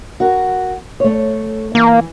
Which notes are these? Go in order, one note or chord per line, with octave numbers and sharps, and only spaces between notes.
F#4 A#4
A3 C#5
E3 A#3